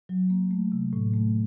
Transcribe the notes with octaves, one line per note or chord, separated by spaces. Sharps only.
F#3
A#3
A3
C3
A2
A3